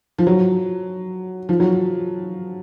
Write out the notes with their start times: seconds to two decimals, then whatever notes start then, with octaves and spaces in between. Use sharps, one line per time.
0.18 F3
0.27 F#3
1.49 F3
1.60 F#3